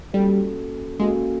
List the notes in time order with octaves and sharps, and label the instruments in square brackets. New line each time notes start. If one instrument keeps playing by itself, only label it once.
[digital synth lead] G3 [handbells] A#3 C#4 F#4 A4
[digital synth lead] G#3 [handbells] A#3 C#4 F#4 A4